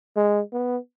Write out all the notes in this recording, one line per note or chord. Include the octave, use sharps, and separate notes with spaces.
G#3
B3